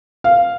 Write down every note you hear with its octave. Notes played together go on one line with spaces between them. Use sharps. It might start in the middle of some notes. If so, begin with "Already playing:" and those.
F5